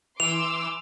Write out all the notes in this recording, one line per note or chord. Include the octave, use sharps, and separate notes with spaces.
E3 C6 D6 E6 F7